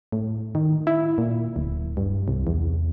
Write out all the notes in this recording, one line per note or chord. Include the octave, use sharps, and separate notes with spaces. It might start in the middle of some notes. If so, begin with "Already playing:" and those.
A2
D#3
E4
A#2
D1
G2
C2
E2